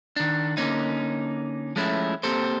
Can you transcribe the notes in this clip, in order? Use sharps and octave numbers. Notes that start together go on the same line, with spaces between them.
D#3 D4
D3 A#3 C#4 D#4
F3 G#3 A3 C#4 E4
A#3 C4 G4 A4 C5